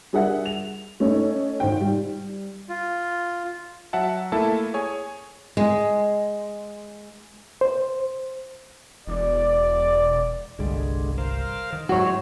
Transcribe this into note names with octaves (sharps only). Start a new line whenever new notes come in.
G3 D4 G#4 A#4 E5 F#5
F7
A3 C#4 D#4 C#5
G#1 C5 G5
G3
F4
F#3 E5 F#5 A5
A3 A#3 E4 A4 A5
G#4 C#5 G#5
G#3
C5
E1 D5
G1 C2 D3 G3 G#3
A#4 C5 F5
D#3
G#2 F#3 G#3 E4 F#4 C5 C#5